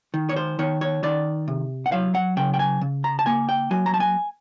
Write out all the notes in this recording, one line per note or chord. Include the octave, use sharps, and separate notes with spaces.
D#3
C#5
C5
D#3 C#5
C#5
D#3 D5
C3
F#5
F#3 F5
F#5
C#3 G5
G5
G#5
C#3
A#5
A5
A#3 G#5
G5
F#3 G#5
A#5
A5
G#5